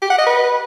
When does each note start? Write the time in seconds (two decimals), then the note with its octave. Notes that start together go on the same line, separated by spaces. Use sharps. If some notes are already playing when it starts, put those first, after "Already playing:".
0.02 G4
0.10 F#5
0.18 D#5
0.26 B4